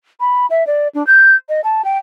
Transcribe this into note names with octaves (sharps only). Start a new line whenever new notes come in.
B5
E5
D5
D4
G6
D#5
A5
G5